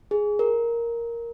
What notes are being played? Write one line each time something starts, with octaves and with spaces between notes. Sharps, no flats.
G#4
A#4